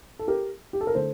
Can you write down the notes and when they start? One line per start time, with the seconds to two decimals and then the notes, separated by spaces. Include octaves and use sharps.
0.19 A4
0.28 G4 A#4
0.73 G4
0.81 A4
0.87 A#4
0.95 D3 A3 A4 C5